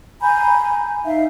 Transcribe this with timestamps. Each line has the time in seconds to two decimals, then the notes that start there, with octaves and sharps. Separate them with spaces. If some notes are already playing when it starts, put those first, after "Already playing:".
0.21 G#5 A#5 B5 G6
1.05 D#4 E5 F5